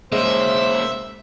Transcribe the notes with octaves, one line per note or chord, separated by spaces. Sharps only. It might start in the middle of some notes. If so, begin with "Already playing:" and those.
G#3 A#3 C#4 C5 E5